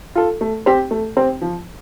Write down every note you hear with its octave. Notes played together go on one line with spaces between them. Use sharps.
F4 A4
A3
C4 G4 C5
A3
C4 G4 C5
F3